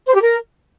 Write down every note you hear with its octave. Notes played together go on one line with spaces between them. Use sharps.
C5
G4
A#4